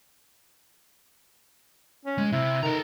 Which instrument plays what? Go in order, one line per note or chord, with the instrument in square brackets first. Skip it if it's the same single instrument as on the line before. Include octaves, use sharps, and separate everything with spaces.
[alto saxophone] C#4
[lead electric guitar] G#3
[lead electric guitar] C3 [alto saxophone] E4
[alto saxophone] D#3 [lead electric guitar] A4 A#5